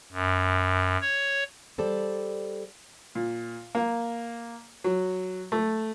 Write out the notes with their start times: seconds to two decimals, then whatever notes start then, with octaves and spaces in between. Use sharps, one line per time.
0.12 F#2
1.01 C#5
1.78 G3 A4 C5 D5
3.15 A#2
3.75 A#3
4.84 F#3
5.52 A3